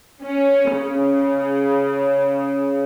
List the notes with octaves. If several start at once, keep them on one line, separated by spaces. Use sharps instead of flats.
C#4
C#3